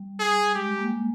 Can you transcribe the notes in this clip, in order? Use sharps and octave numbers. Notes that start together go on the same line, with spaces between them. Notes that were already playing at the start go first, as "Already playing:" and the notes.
Already playing: G3
G#4
G#3 G4
A#3